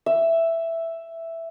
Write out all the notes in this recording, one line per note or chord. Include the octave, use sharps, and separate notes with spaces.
E5